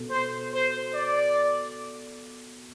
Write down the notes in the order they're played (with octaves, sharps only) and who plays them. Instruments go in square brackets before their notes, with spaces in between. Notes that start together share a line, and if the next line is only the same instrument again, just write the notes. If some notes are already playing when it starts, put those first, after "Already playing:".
Already playing: [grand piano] B2 A4
[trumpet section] C5
C5
D5